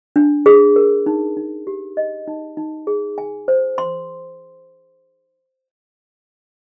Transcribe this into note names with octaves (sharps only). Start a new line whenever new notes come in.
D4
G#4
A#4
D#4
D#4
G4
D#5
D#4
D#4
G#4
G#5
C5
C6